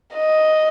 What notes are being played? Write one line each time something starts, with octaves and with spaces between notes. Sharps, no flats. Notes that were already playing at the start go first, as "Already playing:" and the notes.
D#5